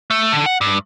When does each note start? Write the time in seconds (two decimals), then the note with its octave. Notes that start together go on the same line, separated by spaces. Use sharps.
0.10 A3
0.32 D3
0.46 F#5
0.61 G2